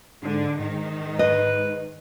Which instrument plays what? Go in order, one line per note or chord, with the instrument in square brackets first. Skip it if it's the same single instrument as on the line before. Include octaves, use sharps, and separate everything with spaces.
[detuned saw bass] G#2 [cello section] D3 G#3 D4
[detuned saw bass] G#2 [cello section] D#3 D#4
[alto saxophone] B4 [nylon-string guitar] D#5